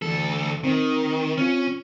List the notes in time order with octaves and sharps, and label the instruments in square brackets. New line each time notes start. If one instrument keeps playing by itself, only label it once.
[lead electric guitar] D2 A4 [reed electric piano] E3
[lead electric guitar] D#3 [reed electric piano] C4 C5
[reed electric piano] C4 F4 [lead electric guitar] C#4